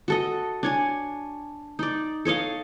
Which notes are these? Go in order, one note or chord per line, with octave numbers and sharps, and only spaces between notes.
F#4 A4 D#5
D4 C#5 G#5
D#4 D5
A4 C#5 D#5 F5